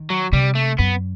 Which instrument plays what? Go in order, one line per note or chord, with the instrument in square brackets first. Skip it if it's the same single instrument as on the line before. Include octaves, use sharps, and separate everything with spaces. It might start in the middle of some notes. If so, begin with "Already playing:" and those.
Already playing: [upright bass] D#3
[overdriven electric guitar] F#3
[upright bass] C3 [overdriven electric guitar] G3
[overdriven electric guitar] A3
[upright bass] F#2 [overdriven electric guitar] B3